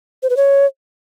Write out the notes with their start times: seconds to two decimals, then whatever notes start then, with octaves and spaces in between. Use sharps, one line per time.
0.23 C5
0.30 B4
0.37 C#5